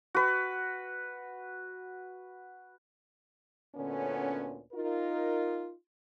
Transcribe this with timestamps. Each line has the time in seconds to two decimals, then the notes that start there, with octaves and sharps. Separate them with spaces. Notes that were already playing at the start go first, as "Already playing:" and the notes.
0.14 F#4 B4
3.76 D2 A#2 D3 B3 C#4
4.73 D#4 F4 A#4